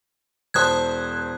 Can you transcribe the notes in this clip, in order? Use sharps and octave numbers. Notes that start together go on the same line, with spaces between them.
E1 C5 A5 D#6 F#6 G#6